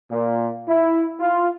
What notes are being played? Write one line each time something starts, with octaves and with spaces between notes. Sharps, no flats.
A#2
E4
F4